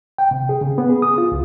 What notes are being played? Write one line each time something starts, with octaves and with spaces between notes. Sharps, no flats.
G5
C3
G#4
C#3
B3
G#4
D#6
F4
C#2